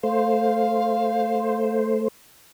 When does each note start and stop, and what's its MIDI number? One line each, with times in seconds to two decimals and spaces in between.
0.03 2.08 57
0.03 2.08 72
0.03 1.78 77